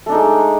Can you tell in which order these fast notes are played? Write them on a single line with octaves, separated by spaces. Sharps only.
A3 D4 D#4 G#3